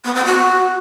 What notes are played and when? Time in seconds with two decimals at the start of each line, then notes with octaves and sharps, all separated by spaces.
0.05 B3
0.15 C4
0.25 F#4